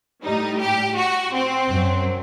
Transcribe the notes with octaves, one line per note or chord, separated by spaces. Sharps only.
A2 G3 D#4
G4
F#4
C4
F#2 F#3